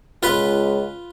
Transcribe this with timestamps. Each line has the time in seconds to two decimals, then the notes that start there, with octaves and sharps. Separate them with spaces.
0.23 C#2 F4 B4